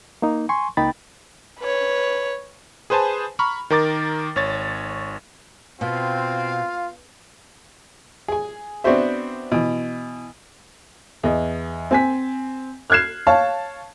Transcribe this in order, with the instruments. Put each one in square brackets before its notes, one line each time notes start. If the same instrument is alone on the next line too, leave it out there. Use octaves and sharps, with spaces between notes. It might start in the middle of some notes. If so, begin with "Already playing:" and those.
[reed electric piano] A#3 D#4
G#5 C6 C#6
C#2 A#3 D#4 G5 B5 A6
[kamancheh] B4 C#5
[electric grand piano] G#4 B4 C5 G#5 A5
A#5 B5 C#6 F6
D#3 A#4 D6 A6
G#1 C#5 A6
[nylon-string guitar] B2 [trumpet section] C4 [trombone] F4 [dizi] F5
[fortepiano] G#4 G#5
B3 C4 D4 F#4 C5 E5
B2 E3
[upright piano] E2 D#5
C4 G#5 B6
F6 F#6 G#6 C7 E7
C#5 F5 A5